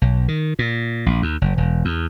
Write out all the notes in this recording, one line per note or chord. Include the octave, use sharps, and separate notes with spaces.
B1
D#3
A#2
A#1
D#2
F#1
E1
E2